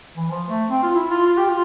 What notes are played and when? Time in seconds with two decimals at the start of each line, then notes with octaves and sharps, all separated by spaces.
0.16 E3
0.31 F3
0.47 A3
0.70 C4
0.83 F4
0.95 E4
1.11 F4
1.26 F4
1.37 G4
1.49 F4